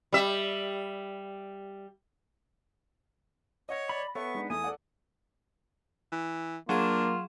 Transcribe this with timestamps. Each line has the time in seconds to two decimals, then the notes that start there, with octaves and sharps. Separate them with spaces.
0.12 G3 E5
3.69 C#5 D#5 F#5 A#6
3.89 D5 B5
4.15 B3 A4 C#5 E5 C#6
4.35 G#3 D4 D#4
4.50 E2 A3 E4 G#5 D#6
4.64 A4 D5 F#5
6.12 E3
6.69 F#3 A#3 D4 F4 G#4 E7